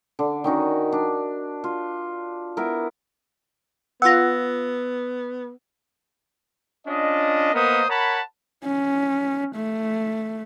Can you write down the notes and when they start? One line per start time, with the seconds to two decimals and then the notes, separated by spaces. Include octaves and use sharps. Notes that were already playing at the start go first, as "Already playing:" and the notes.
0.19 D3
0.44 D#3 C#4 D#4 F#4
0.92 D4
1.64 F4
2.57 B3 E4 A#4
4.02 B3 F4 F#5 E6 A#6
6.87 C#4 D4 F4 D#5
7.54 A#3 B3 A#4 C5 D#5 D#6
7.89 A#4 C#5 F#5 A5 B5
8.65 C#4
9.56 A3